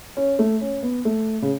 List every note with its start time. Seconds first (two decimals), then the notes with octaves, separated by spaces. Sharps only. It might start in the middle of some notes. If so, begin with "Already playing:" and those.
0.17 C#4
0.39 A3
0.61 C#4
0.83 B3
1.05 A3
1.42 C#3